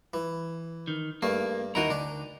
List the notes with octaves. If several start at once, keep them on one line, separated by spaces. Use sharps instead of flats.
E3
D#3
G2 A3 A#3
D#2 D#4 E4 F#4 A#4
D2 D4